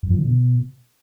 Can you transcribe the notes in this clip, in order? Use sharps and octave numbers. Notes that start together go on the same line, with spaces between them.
F#2
F3
D3
B2